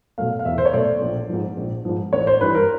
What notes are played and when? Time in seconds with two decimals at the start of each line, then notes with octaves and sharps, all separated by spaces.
0.18 B2 F#3 A3 F5
0.39 F5
0.45 E2 E5
0.58 C5
0.66 C#5
0.73 B2 F#3 A3 D5
1.02 A#1
1.29 G#2 F3
1.57 A#1
1.85 G#2 F3
2.13 A1 C#5
2.27 C5
2.41 G2 E3 G3 B4
2.55 A#4